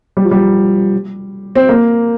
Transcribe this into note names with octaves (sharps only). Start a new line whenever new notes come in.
G3
F3
G3
C4
A#3